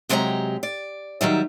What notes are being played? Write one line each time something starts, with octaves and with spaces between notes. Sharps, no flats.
C3 F#3 G#3 G4 D5 A#5
D5
D#3 F#3 G3 E5